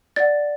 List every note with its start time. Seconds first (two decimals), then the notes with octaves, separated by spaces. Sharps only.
0.16 D5 F#5 A6